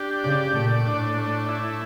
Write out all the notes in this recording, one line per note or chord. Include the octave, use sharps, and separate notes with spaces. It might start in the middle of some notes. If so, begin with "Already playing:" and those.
Already playing: D4 G4
C#3 D5
A#2 A3
A2 D4
A3
E4